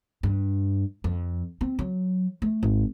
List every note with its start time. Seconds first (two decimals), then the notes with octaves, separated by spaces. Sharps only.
0.23 G2
1.04 F2
1.61 C4
1.79 F#3
2.42 A3
2.63 G#1